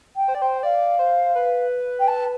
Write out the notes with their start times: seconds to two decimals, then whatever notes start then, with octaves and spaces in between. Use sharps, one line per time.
0.16 G5
0.28 C5
0.35 D5
0.40 C5 G5
0.63 D5 F5
0.99 C5
1.35 B4
1.99 G5
2.07 A5